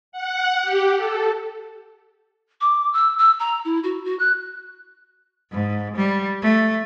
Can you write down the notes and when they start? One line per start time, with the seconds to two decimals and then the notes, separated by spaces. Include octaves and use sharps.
0.12 F#5
0.62 G4
0.97 A4
2.61 D6
2.93 E6
3.18 E6
3.40 A#5
3.65 E4
3.84 F#4
4.05 F#4
4.20 F#6
5.52 G#2
5.96 G3
6.42 A3